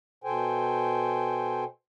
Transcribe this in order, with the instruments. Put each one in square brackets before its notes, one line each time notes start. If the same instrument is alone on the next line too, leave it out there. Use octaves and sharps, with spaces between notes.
[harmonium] B2 A4 C5 G5 G#5